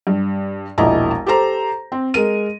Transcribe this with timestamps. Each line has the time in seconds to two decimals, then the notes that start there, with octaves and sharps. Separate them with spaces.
0.07 G2
0.78 E1 A#1 E4 D#5 E5 A#5
1.26 G4 A4 C5 A#5
1.92 C4
2.14 G#3 A#4 D#7